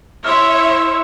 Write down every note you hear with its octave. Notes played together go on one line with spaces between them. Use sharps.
E4 C#5 E5 C6 E6 F6